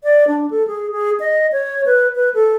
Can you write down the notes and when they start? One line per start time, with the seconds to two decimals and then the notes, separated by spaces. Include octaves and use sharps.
0.04 D5
0.27 D4
0.50 A4
0.67 G#4
0.91 G#4
1.20 D#5
1.52 C#5
1.86 B4
2.15 B4
2.34 A4